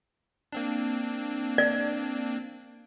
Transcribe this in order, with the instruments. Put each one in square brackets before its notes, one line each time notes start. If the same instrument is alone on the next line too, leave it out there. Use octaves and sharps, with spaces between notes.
[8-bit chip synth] A#3 C4 D4
[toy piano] D5